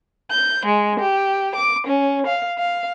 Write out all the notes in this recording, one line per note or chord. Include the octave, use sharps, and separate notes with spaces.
G6
G#3
G4
D6
C#4
F5
F5